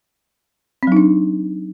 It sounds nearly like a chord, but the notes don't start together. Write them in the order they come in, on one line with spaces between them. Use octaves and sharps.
C4 F#3 D#4 D4